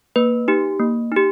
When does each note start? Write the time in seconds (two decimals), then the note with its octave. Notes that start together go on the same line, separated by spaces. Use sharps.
0.16 A#3 B4
0.48 D#4 G4
0.79 A#3
1.12 D#4 G4